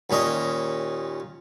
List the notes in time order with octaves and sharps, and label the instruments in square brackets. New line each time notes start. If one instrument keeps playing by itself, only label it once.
[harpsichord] D#2 A#2 C#4 D#5